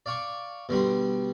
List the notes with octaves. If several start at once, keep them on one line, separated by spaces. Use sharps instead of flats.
D5 F5 G5 C#6 D6
B2 D3 G3 C6